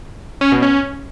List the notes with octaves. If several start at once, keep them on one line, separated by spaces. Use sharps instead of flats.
C#4
B2
C#4